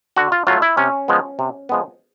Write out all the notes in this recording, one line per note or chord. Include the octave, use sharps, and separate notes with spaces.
D3 F#4
F4
F#3 A3 F4
E4
C3 C#4
F3 G#3 B3
C3
F3 G#3 B3